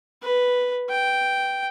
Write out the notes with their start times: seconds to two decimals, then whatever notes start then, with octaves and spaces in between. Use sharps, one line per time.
0.22 B4
0.89 G5